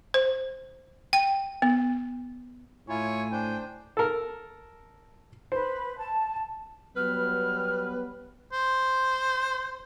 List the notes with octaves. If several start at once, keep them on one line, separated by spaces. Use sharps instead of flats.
C5
G5
B3
A2 E4 F4 C#5 G#5
D4 C5 G5
A4 A#4
B4 C5
A5
F#3 G3 B3 B4 F6
C5